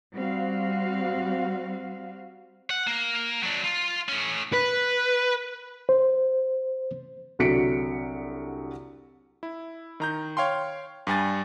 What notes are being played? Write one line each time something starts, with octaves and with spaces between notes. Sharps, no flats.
G3 C4 F#4 F5
F#5
A#3
F#3 D4
F4
A2 C#4
B4
C5
C2 D3 F#3 B6 C#7 D7
E4
D#3 A#5 G6
C#5 F5 G5 C6
G2 G3 G#5 A6